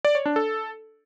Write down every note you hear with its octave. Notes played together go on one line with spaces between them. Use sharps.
D5
C#5
D4
A4